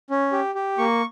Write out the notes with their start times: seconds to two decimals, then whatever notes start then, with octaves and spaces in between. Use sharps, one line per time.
0.10 C#4
0.32 G4
0.55 G4
0.78 A#3 C#6